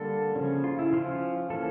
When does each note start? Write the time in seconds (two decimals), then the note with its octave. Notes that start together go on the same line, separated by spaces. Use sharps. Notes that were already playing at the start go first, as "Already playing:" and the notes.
Already playing: D3 G3 A#3 D4 A4
0.35 C#3 F3 C#4
0.64 F4
0.79 E4
0.93 F3 C#4 F4
1.50 E3 A#3 C#4 A4